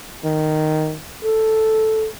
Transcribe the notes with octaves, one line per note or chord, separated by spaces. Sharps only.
D#3
A4